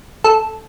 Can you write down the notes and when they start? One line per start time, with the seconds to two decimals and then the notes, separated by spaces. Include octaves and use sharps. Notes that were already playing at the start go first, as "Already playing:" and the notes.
0.24 A4